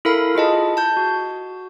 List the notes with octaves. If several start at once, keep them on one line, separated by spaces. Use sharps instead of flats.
E4 A4 A#4 F5 B5
F4 G#4 D#5 A5
A5 G6
F#4